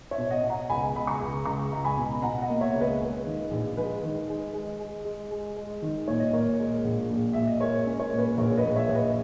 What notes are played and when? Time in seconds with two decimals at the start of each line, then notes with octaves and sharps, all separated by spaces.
0.11 C#5 E5
0.18 B2
0.31 D#5 F#5
0.43 B2
0.50 F#5 A#5
0.70 C#2 G#5 B5
0.95 C#2 B5
1.07 A#5 C#6
1.20 C#2
1.45 C#2 A#5 C#6
1.72 C#2 A#5
1.84 G#5 B5
1.97 B2
2.22 B2 F#5 A#5
2.42 D#5 F#5
2.49 A#3
2.61 C#5 E5
2.74 C#2
2.81 B4 D#5
3.00 G#3
3.25 D#3
3.51 A#1
3.77 G#3 B4
4.03 D#3
4.29 G#3
4.54 G#3
4.80 G#3
5.04 G#3
5.31 G#3
5.57 G#3
5.82 D#3
6.08 A#2 C#5
6.20 D#5
6.32 A#2 A#4 C#5
6.59 G#3
6.85 A#1
7.10 A#2
7.33 A#2 E5
7.47 D#5
7.60 G#3 A#4 C#5
7.86 C#4
7.99 A#4 C#5
8.13 A#2
8.18 B4
8.37 A#1 A#4 C#5
8.57 B4 D#5
8.64 A#2
8.76 C#5 E5
8.89 A#1
8.95 B4 D#5